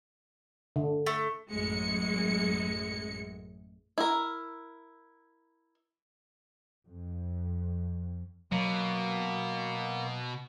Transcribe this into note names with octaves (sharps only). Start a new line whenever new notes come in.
D3
A3
A1 F#2 G#3 C#7
E4 A#4
F2
B2 F#3 A#3